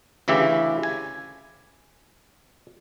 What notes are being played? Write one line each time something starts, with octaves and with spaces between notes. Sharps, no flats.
D2 C#3 E3 G4 E5
G#5